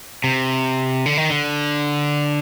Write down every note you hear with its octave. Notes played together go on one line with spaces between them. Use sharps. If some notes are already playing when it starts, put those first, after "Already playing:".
C3
D3
D#3
D3